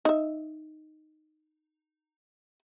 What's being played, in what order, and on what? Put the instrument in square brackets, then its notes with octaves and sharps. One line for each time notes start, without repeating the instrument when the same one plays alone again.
[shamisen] D#4 E5